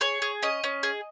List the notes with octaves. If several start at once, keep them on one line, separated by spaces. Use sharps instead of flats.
G#4 C#5
G#4
C#4 D#5
C#4
G#4